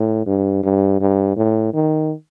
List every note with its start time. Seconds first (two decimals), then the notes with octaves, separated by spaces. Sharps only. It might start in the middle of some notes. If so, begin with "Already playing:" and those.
Already playing: A2
0.26 G2
0.63 G2
1.00 G2
1.37 A2
1.74 D#3